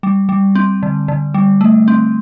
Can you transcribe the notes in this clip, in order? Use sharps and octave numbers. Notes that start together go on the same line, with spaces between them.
G3
G3
C4
D3
D3
G3
A3
C4